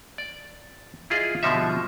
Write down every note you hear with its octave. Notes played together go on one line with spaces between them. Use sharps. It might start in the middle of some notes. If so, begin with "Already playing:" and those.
D5
E4 F4 G#4 D#5 F5
B2 D3 F3 G3 D#4 E5